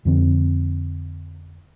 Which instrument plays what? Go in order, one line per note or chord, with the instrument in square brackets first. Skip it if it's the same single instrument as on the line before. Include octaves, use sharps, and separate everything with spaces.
[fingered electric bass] F2 D3 C4